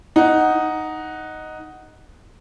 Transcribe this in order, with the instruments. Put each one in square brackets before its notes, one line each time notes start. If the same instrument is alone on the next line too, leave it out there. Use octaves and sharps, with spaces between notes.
[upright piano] D#4 F#5